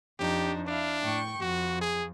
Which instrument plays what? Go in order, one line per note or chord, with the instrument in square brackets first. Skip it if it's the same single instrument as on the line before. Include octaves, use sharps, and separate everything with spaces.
[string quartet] F2 D4 D#4 [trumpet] G4
[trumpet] D4 [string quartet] E4 F5
[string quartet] A2 G5 C#6
[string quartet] F2 [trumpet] F#4
[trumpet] G#4